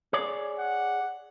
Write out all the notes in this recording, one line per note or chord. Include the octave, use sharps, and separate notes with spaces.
G#4 C#5 D5
F#5